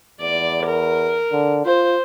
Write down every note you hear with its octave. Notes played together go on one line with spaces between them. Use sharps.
E2 D5
A#4
D3
F4 C5